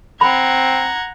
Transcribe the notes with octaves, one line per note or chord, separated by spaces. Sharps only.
C4 F#5 A#5 B5 G#6